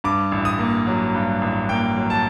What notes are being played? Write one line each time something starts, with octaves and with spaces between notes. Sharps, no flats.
G2 D6
A1
D#6
A#3
F#3
G2
A1
A#3 G5
F#3
A5